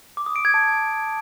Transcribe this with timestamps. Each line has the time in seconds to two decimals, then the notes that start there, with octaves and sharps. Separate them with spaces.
0.17 D6
0.26 D#6
0.36 D7
0.45 G#6
0.54 A5